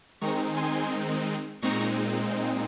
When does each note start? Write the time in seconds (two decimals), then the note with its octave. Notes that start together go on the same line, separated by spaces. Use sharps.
0.21 D#3 G#3 C4 D#4 A#5 C#6
0.57 G#5 C6
1.62 A#2 G#3 C4 D#4 A#5 C#6